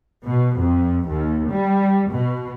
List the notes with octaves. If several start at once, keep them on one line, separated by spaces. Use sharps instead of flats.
B2
F2
D#2
G3
B2